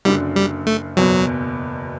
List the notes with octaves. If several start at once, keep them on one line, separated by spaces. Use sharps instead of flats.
F#1 F#2 D3 G3
G3
A3
F#1 E2 B2 F#3